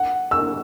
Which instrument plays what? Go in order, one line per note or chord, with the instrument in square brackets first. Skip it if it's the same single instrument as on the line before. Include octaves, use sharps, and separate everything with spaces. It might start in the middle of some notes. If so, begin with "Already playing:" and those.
Already playing: [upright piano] F#5
E6